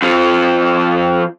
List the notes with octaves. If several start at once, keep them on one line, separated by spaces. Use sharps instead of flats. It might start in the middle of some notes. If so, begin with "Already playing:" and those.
F2 F3